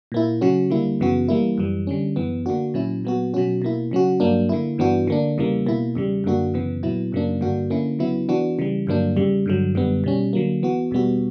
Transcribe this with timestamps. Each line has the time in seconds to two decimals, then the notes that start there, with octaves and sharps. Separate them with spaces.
0.12 A#2 A#3 E4
0.41 C#3 F#3 C#4 F#4
0.70 D3 G3 A#3 E4
1.00 F#2 C#3 E3 B3 F#4
1.28 E3 G3 A#3 E4
1.58 F#2 E3 G3
1.87 D3 G3 C#4
2.16 F#2 E3 B3
2.46 D3 A#3 D4 F#4
2.74 A#2 F#3 C#4 E4
3.04 A#2 F#3 B3 F#4
3.34 B2 F#3 C#4 F#4
3.62 B2 A#3 E4
3.91 C#3 F#3 C#4 F#4
4.20 G2 F#3 A#3 D4
4.49 D3 A#3 E4
4.78 G2 E3 B3 D4 F#4
5.07 D3 A#3 D4
5.38 E2 C#3 E3 G3 A#3
5.66 B2 A#3 E4
5.95 E2 C#3 G3
6.24 F#2 D3 A#3 D4 F#4
6.54 F#2 C#3 E3 B3
6.83 A#2 F#3 B3 E4
7.12 F#2 C#3 F#3 A#3 D4
7.41 G2 D3 A#3 D4 F#4
7.70 D3 A#3 C#4 E4
7.99 C#3 F#3 B3 E4
8.29 E3 B3 D4 F#4
8.59 C#3 E3 G3
8.87 G2 D3 F#3 A#3 D4
9.16 E2 C#3 G3
9.46 G2 D3 F#3
9.75 F#2 D3 G3 B3
10.04 B2 G3 C#4
10.33 D3 F#3 A#3
10.63 E3 B3 F#4
10.91 E2 B2 G3 B3 F#4